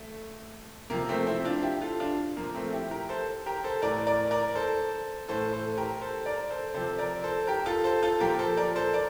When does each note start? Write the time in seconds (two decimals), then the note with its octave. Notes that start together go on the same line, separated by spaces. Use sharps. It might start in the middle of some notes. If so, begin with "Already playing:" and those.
Already playing: A3
0.90 C3 F3 A#3
1.08 A3 C4
1.26 C4 E4
1.45 D4 F4
1.63 E4 G4
1.81 F4 A4
2.00 D4 F4
2.36 A#2 F3 A#3
2.55 A3 C4
2.72 E4 G4
2.91 G4 A#4
3.09 A4 C5
3.46 G4 A#4
3.64 A4 C5
3.82 A2 E3 A#4 D5
4.07 A#4 D5
4.31 A#4 D5
4.55 A4 C5
5.28 A2 E3 A4 C5
5.53 A4 C5
5.77 G4 A#4
6.02 A4 C5
6.26 A#4 D5
6.50 A4 C5
6.74 C3 F3 A4 C5
6.99 A#4 D5
7.24 A4 C5
7.47 G4 A#4
7.66 F4 A4
7.84 A4 C5
8.02 F4 A4
8.20 A#2 F3 G4 A#4
8.39 A4 C5
8.57 A#4 D5
8.76 A4 C5
8.93 A#4 D5